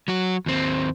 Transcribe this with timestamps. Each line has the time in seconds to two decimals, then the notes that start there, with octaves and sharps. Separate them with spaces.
0.08 F#3 F#4
0.46 D#2 C4